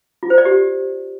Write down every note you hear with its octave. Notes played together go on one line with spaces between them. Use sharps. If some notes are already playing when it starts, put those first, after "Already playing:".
F4
C5
D5
G4